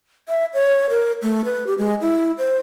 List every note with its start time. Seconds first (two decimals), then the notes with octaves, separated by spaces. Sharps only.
0.29 E5
0.54 C#5
0.90 A#4
1.22 A3
1.45 B4
1.67 G4
1.78 G#3
2.01 E4
2.38 C5